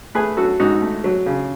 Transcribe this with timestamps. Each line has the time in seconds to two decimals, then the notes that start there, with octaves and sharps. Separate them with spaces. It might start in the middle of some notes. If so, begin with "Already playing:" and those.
0.15 A3 G#4 B4
0.37 F#3 F#4 A4
0.60 G#2 D#4 F#4
0.82 A3
1.04 F#3
1.26 C#3